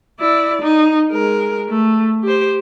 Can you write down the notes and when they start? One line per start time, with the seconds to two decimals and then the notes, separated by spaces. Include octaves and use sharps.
0.20 E4 D5
0.62 D#4
1.12 G#3 A#4
1.69 A3
2.24 G4 C5